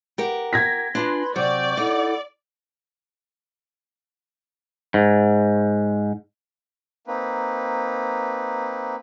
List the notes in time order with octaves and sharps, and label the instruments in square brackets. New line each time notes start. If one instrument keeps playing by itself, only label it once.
[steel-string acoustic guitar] G4 A#4 F#5
[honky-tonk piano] G#6 A#6 B6
[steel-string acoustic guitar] D4 F4 G#5 [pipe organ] B4 B5 C6
[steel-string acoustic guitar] C3 F#3 [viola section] D5 [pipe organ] C#6 G6
[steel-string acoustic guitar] D#4 [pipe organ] E4 A4 F#5
[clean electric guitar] G#2
[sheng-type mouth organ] A#3 C4 D#4 B4